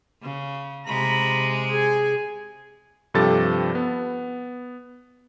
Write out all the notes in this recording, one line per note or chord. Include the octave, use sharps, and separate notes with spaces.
C#3
C3 G#3 A#5 B5
G#4 G#5
G2 C3 F3 G4 A4 A6
B3